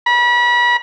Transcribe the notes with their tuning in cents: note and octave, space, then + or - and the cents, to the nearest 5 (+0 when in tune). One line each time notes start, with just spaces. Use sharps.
B5 -35